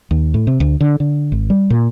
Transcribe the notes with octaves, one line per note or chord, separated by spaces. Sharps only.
D#2
A2
C3
D2
D3
D3
G#1
G3
A#2